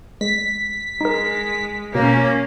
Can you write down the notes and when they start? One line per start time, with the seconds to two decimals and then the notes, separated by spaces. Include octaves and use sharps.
0.21 G#3 B6
1.01 G#3 D#4 A#4
1.95 B2 A#3 C#4 C#5 G6